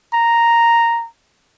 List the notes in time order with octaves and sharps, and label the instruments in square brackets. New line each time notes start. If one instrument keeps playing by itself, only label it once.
[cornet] A#5